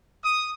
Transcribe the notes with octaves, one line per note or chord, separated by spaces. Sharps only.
D#6